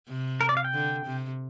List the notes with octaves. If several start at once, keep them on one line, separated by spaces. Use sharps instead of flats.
C3
A#4
D5
F5
G5
D3
C3